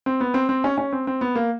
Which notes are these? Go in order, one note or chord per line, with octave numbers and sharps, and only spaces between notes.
C4
B3
C4
C4
C#4
C#4
C4
C4
B3
A#3